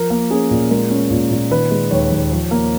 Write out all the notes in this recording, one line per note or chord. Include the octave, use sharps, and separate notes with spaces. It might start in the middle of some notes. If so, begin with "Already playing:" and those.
Already playing: F3 A#4
A#3
C#4 G#4
A#2
G#3 A#4
C#4
A#2
A#2
D#3 B4
G#3
D#2 C#5
D#2
F3
A#3